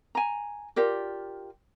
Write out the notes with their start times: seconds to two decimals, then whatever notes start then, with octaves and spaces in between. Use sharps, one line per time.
0.15 G#5 A#5
0.76 F4 G4 A#4 D5